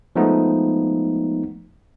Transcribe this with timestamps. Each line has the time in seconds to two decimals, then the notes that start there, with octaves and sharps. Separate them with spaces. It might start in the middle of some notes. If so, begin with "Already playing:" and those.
0.16 F3 G#3 A3 B3 D#4